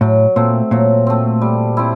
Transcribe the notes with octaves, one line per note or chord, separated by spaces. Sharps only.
A2 F#3
A#2 A3 C4
A#2 F#3
A3 C4
G3
C4 E4